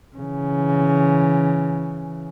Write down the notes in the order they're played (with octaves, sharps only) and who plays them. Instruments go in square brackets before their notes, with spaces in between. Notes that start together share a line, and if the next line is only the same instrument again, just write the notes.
[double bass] C#3 E3